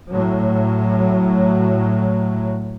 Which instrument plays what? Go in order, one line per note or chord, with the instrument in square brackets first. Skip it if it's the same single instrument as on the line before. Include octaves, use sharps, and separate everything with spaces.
[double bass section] A2 F#3